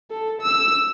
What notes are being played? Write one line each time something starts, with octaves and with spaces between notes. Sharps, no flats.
A4
E6